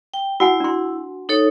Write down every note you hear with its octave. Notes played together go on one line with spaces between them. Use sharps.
G5
E4 F#4 F#5 G#5
D4 C6
D#4 A4 C#5